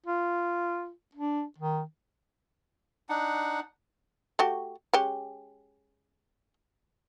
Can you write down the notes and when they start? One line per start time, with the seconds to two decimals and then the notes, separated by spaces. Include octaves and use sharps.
0.07 F4
1.15 D4
1.58 D#3
3.09 D4 D#4 F#5
4.39 A3 F#4 G4
4.93 G#3 C#4 G4